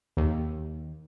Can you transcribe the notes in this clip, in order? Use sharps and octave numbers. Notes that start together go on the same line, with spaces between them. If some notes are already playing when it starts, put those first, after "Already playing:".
D#2